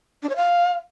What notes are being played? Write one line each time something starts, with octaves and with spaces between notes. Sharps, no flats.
D4
C#5
F5